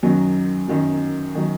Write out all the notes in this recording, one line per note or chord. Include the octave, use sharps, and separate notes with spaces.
F#2 D#3 F#3
F#2 D#3 F#3
D#3 F#3